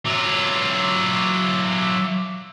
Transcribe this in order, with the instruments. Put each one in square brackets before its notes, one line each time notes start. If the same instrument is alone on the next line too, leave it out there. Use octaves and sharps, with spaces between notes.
[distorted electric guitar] F#3 F4 [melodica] E5 D6